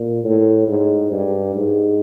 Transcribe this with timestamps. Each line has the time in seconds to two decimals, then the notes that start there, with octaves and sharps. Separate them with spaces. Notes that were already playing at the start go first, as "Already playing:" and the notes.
Already playing: A#2
0.24 A2
0.68 G#2
1.11 G2
1.56 G#2